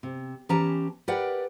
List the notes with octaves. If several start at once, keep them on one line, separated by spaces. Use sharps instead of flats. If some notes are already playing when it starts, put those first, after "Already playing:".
C3
E3 C#4 G4 A5 A#5
G4 A#4 B4 D5 F#5 G5